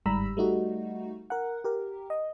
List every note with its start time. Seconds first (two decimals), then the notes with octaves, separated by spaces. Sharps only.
0.06 G1 G#2 G3 A#5 B5 E6
0.37 G3 A3 D#4 F#4
1.30 A#4 F#5
1.64 G4 A#4
2.10 D#5